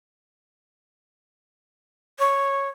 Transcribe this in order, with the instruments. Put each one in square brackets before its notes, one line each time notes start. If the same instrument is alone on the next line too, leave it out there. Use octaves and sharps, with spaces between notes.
[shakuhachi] C#5